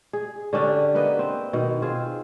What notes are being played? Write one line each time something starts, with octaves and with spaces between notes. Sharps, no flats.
G#4
D3 C#4 D4 G4
A#3 B3 B4 D#5
C4
B2 D#3
C4 F4 G#4